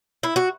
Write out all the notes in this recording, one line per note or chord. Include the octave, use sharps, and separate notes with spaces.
E4
F#4